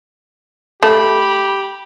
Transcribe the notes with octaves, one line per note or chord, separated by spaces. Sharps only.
A3 G4 B5